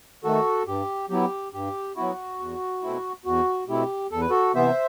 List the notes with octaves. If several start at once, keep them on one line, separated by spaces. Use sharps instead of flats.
D#3 A3 F#4 A4
G2 G4
F#3 B3 E4 G4
G2 G4
F#3 B3 E4 F#4
E2
B2 A3 C4 E4
E2 F#4
B2 A3 C4 E4 G4
E2 A4
B4
F#4 A4
C3 E3 B3 C5 E5